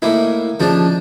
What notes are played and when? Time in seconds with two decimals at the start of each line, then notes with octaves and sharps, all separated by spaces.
0.02 A2 A#3 D#4 E4
0.60 C#3 F3 D4 D#4